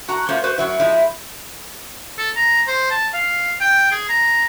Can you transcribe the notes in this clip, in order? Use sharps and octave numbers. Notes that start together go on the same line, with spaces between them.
F#4 A#5
A3 A#3 C#4 F4 C5
F#4 B4 C5
F#2 F#3 E4
F3 G#3 D#4 E4
A4
A#5
C5
A5
F5
G5
G#4
A#5